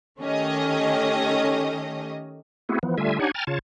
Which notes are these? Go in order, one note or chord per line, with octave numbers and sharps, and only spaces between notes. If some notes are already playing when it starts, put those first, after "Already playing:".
D#3 A3 C#4 G4 D#5
A3 B3 C4 E4 F#4 G#4
E3 F3 B3
D3 G3 A3 F4 E5 G#5
D4 D#4 G4 C#5 F#5 G#5
G5 G#5 A#5 F6 A6
C#3 F4 C#5 A5